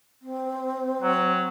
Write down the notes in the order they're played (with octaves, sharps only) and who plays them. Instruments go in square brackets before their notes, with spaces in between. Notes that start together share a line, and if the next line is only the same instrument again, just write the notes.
[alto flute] C4
[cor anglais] F#3